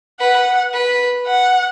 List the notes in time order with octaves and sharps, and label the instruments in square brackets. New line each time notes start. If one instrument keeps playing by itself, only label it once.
[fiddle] B4 [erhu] F#5
[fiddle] B4
[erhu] F#5